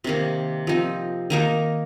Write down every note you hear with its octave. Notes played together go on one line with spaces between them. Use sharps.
C3 D#3 A#3
F3 C4 D#4
D#3 A#3 D#4 A#4